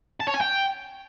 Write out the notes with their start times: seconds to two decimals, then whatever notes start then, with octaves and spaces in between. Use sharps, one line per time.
0.20 A5
0.27 C#5
0.34 G#5
0.41 G5